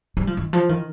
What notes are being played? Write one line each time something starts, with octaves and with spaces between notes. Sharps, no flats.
G3
F3
D#3
F3
D#3